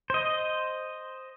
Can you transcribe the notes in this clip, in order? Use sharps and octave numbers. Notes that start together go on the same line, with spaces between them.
C5 D#5